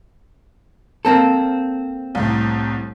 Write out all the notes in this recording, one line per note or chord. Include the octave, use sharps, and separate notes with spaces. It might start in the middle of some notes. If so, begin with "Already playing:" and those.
A#3 C4 A4
C2 A2